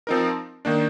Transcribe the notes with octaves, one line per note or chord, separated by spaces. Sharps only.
F3 C4 D#4 A#4
D#3 A#3 D4